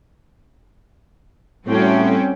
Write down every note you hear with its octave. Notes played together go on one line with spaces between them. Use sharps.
A2 G3 C4 C#4 F#4 G5